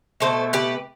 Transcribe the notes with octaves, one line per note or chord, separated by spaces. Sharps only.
B2 A3 A4 C5
G4 B4